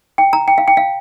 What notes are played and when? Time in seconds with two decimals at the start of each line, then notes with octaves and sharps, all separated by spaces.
0.18 G5
0.33 A#5
0.48 G5
0.58 F5
0.68 G5
0.77 F5